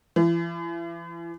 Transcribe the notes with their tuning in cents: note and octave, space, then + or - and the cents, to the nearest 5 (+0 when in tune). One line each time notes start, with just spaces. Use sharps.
E3 +40